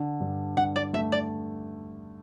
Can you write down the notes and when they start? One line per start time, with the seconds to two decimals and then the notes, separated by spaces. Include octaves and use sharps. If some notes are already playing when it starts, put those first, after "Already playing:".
Already playing: D3
0.20 G2
0.57 G2 F#5
0.76 D5
0.93 A3 E5
1.12 D5